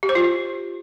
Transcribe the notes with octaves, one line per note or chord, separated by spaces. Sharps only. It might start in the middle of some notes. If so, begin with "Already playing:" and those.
G4
C5
F4